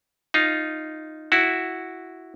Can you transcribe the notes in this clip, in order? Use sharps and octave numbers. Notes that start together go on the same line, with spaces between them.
D#4 F4
E4 F#4